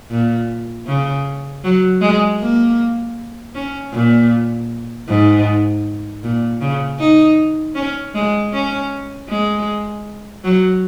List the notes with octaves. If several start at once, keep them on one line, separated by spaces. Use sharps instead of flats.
A#2
C#3
F#3
G#3
A#3
C#4
A#2
G#2
A#2
C#3
D#4
C#4
G#3
C#4
G#3
F#3